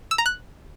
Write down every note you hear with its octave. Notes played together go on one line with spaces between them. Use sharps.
E6
A#5
F#6